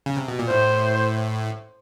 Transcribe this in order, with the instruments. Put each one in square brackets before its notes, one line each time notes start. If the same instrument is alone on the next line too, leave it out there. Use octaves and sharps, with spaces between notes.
[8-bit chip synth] C#3
C3
B2
A#2
[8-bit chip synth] A2 [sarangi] C5